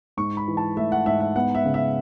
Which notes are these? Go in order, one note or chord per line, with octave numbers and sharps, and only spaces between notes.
G#2 C#6
B5
E3
A5
A3 E5
F#5
G#2 E5
E5
B3 F#5
E5
C#3
E5